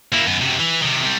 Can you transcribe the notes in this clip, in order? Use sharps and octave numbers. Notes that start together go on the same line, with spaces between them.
A#3 E4
F#2 B3
F#2 C3
E3
C3 D#3
C3 G3